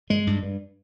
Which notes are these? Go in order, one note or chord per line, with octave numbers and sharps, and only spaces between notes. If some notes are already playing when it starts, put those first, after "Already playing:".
G2 G#3
G2
G2